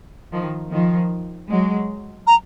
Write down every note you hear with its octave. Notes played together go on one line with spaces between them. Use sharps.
D#3 F3
D#3 F3
F#3 G#3
A#5